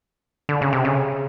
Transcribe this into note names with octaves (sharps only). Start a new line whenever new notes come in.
D3
C#3
C3
C#3